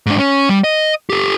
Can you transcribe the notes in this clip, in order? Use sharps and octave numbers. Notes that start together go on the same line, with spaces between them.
G#2 D4
C#4
G3
D#5
G4 A4